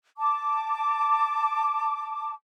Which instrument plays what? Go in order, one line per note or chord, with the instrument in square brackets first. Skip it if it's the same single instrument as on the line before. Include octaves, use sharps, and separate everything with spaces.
[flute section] A5 D6